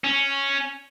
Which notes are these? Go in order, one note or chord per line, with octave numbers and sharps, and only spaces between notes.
C#4